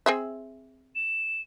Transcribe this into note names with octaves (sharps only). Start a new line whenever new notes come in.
C4 G#4 E5
E7